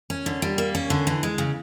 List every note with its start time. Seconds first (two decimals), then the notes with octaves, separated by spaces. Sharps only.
0.10 C#4
0.26 D3
0.42 G3
0.58 A#3
0.75 C#4
0.90 D3
1.07 E3
1.23 G#3
1.38 C#3